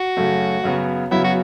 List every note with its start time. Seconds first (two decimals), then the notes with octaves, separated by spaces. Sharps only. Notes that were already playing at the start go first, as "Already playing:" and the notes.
Already playing: F#4
0.17 F#2 C#3 A3
0.64 F#2 C#3 F#3 B3
1.11 F#2 C#3 F#3 B3 E4
1.24 F#4